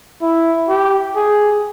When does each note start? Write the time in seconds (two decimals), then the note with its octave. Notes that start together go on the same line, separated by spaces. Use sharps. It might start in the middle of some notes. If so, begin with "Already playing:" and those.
0.22 E4
0.69 G4
1.16 G#4